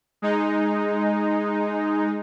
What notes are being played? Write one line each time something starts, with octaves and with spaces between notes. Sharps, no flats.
G#3 D#4